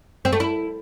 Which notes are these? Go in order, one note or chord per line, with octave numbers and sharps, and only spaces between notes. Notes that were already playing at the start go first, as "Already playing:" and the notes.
C4
A3
E4